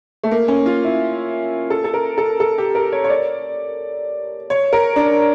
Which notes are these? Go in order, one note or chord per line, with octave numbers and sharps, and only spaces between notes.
A3
A#3
C#4
F4
E4
A4
A4
A#4
A4
A4
G4
A#4
C#5
C#5
D5
C#5
A#4
D4